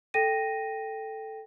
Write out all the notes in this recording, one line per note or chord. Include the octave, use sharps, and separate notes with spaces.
A4 G5 A#6 D#7